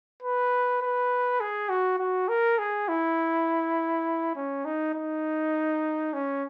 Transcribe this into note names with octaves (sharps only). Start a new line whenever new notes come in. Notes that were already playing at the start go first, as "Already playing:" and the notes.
B4
B4
G#4
F#4
F#4
A#4
G#4
E4
C#4
D#4
D#4
C#4